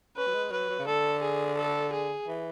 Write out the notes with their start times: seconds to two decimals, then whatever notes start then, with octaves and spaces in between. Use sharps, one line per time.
0.16 C#4 B4
0.27 F#3
0.34 G#3
0.51 F#3 B4
0.69 F#3
0.79 C#3
0.87 D3 A4
1.22 G#4
1.57 A4
1.92 G#4
2.28 E3